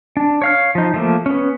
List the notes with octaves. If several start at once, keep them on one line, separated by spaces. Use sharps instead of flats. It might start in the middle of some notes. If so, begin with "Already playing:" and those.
D4
C#5 F5 F6
F3 D#4
F3 A3 A#3
B3 C#4